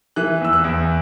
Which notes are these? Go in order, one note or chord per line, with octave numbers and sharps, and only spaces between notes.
E3 F#6
E2 E6
F#6
E2